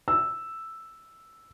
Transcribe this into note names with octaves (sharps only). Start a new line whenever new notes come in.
E6